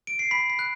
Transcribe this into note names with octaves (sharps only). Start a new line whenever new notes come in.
D7
C7
B5 B6
B6
F#6